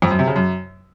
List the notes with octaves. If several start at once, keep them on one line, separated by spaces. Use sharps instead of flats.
F2
F#2
C3
C#3
F#2